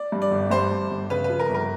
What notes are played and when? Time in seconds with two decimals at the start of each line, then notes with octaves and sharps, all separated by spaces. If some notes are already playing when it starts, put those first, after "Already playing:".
Already playing: D5
0.12 G2
0.22 D5
0.31 G1
0.50 G2 C5
0.71 G2
0.90 G1
1.10 C#3 B4
1.24 B4
1.30 F3
1.39 A#4
1.49 G1
1.54 A#4